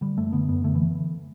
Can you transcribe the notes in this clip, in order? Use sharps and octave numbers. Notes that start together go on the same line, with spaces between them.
D3 G3
F#2 A3
D3 B3
F#2 B3
D3 A3
E3